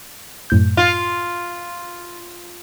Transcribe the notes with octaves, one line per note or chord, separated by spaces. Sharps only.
F#2 A2 G6
F4